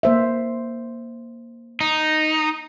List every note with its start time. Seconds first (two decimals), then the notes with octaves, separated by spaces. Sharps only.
0.03 A#3 C5 E5
1.81 D#4